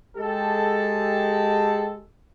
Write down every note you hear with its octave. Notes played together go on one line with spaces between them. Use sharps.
G#3 G4 A4